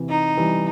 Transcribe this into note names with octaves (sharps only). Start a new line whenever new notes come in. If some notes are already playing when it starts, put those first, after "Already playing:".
Already playing: C3 E3
D#4
E3 G3